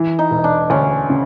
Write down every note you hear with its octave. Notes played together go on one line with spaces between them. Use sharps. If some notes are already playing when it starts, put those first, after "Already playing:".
Already playing: E3
D#4
E1
D4
D2 C#4
C#3